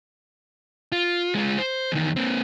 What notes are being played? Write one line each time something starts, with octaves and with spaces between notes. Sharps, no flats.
F4
G#3 F4
C5
E2 D#3
A#3 C4